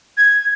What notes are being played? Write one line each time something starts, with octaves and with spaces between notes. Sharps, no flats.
G#6